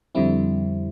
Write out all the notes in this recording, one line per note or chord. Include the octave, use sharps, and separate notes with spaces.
F2 D3 G3 C4 E4